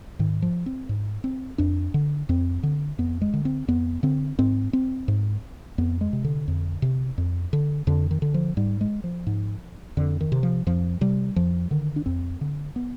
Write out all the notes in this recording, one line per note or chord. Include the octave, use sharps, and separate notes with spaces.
G#2 D#3
F3
C4
G#2
C4
F2 D4
D3
F2 C4
D3
F2 B3
G#3
D3
C4
F2 B3
D3 C4
G#2 C4
C4
G#2
F2 B3
G#3
C3
D3
F2
C3
F2
D3
F2 D3
D#3
D3
F3
G#2 G3
G#3
F3
G#2
F2 D3
D#3
C3
F3
F2 F3
C3 G3
F2 F3
D3 D#3
D4
F2 C4
D3
B3